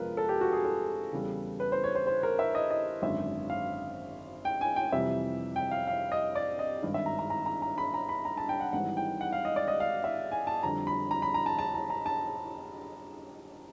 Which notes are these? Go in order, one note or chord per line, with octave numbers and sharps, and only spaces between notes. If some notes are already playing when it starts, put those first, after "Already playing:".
Already playing: G1 F2 C3 F3 G#3 F4 A#4 B4
A4
G4
F#4
G#4
A4
E2 C#3 E3 G3
B4
C5
C#5
C5
C5
A#4
E5
D#5
D#5
G#1 F#2 D3 E5
F5
G5
G#5
G5
F2 C3 E3 G3 E5
G5
F5
F5
D#5
D5
D#5
G#1 G2 D#3
E5
A#5
A#5
A#5
A#5
A#5
B5
A#5
B5
A#5
A5
G5
F#5
G#1 G#2 E3 G3 F#5
G5
F#5
F5
D#5
D5
D#5
F5
E5
G#5
A5
F2 D3 G3 A#5
B5
A#5
B5
A#5
A5
A5
A#5
A#5
A5